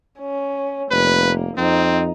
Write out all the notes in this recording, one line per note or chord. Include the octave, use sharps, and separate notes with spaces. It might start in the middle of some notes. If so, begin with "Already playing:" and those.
C#4
F1 A#3 B4
F2 C4 D#4